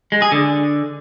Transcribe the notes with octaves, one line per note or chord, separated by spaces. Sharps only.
G#3
G#4
D3